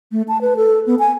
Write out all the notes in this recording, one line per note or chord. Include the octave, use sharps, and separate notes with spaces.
A3
A5
B4
A4
B3
G#5